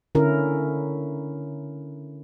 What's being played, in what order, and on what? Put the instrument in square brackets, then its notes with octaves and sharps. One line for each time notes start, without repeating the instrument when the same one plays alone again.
[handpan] D3 C#4 E4 A#4